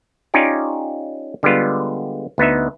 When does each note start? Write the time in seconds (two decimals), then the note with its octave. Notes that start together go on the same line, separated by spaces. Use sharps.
0.34 C#4 D#4 F4 G4 D5
1.43 D3 G3 G#3 B3 F4
2.38 D2 B3 D#4 E5